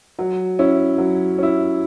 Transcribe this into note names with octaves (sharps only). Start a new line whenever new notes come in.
F#3
C#4 E4
F#3
C#4 E4